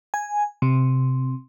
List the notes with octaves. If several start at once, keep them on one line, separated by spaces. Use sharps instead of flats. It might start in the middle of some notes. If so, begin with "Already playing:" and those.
G#5
C3